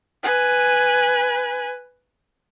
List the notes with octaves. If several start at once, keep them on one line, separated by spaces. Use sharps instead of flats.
B4 G#5